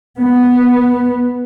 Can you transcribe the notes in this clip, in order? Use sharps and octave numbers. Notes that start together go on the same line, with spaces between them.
B3